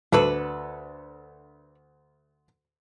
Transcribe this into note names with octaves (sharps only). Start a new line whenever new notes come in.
D2 D4 F#4 A4 B4